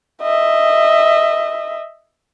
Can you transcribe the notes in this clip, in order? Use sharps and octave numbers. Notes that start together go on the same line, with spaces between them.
D#5 E5